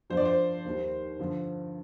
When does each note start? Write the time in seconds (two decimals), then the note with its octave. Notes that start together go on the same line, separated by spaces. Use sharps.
0.10 G2 F3 C5
0.17 D5
0.25 C5
0.65 D#2 D#3 G3
1.20 G2 D3 F3